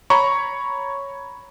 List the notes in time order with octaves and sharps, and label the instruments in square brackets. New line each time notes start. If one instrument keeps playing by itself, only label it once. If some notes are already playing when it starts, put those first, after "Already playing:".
[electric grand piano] C#5 A#5 B5 C#6